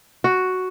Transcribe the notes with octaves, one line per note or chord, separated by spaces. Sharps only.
F#4